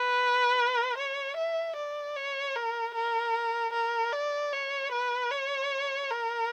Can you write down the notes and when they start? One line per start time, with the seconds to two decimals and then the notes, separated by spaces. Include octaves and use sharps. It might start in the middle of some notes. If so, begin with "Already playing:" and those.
Already playing: B4
0.98 C#5
1.37 E5
1.76 D5
2.16 C#5
2.56 A#4
2.94 A#4
3.73 A#4
4.13 D5
4.53 C#5
4.92 B4
5.32 C#5
6.11 A#4